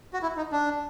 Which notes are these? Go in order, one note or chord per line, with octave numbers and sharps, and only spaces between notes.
F#4
E4
D#4
D4